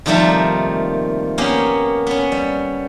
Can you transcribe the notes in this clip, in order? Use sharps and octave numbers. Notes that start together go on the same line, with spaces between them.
C3 D#3 F3 G3 A3 A#3
A#3 B3 C#4 G4 F5
B3 C#4
G3